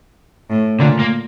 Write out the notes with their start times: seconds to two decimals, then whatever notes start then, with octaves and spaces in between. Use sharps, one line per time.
0.50 A2
0.79 A#2 D3
0.99 A#3